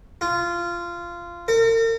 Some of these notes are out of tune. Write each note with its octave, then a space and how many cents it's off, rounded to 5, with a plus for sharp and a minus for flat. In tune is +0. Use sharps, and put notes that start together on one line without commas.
F4 -15
A#4 -40